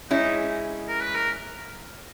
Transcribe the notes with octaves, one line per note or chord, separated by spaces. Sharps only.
G#3 C#4 D#4 E4
A#4
B4
A#4